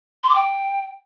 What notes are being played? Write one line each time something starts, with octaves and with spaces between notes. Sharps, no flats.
C6
D6
G5